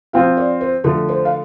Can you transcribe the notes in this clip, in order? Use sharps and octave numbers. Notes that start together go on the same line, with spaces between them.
F3 C4 F4 F5
D5
C5
D3 F3 A3 A4
C5
F5